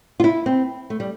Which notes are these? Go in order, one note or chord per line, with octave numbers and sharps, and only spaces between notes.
F4
E4
C4
A3
G3